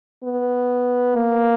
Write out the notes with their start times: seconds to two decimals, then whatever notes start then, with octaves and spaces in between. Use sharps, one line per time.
0.24 B3
1.15 A#3